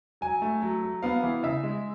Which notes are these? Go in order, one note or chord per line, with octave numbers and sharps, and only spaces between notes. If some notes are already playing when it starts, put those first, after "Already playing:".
F#3 G#5
A3
F#3
F#3
B3 F5
E3
C#3 E5
G#3